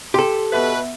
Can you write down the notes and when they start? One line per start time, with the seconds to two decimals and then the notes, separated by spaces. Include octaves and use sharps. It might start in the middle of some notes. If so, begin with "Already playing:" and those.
0.14 G4 A4 G5 C6
0.52 B2 B3 B4 E5